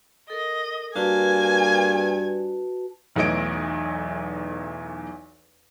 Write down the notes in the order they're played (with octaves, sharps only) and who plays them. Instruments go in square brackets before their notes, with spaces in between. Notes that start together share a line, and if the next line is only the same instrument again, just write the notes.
[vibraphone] A4 A#4 [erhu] D#5
[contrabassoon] G2 [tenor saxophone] A#3 [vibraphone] F#4 B4 A5 [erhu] G#5
[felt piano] B1 E2 A3 C#5 D#5 D7